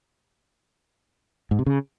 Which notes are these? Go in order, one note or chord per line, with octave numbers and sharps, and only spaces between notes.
G#2
C3
C#3